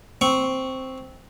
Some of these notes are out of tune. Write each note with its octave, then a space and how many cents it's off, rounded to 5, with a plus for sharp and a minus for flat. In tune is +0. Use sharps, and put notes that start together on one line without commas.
C4 +0 C#6 +0